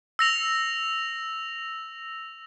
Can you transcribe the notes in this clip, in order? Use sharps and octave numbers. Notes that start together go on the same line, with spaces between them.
E6 A#6 F7